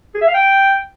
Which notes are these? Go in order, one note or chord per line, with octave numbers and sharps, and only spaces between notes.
G#4
E5
F5
G5